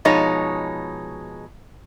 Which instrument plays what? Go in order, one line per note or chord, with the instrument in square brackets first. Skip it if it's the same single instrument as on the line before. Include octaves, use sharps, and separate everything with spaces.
[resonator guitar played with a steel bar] B2 F3 G#3 D#4 C#5